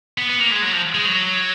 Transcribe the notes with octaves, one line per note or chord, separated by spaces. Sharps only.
B3
B3
A#3
G#3
F#3
F3
G#3
F#3